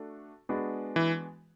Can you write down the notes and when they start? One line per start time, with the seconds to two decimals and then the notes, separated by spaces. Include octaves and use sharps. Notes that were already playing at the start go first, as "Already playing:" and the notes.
Already playing: A3 D4 F#4 A4
0.49 G#3 B3 D4 F#4 B4
0.96 E3